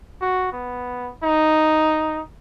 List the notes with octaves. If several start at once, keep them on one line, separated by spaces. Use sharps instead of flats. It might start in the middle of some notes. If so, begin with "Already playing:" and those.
F#4
B3
D#4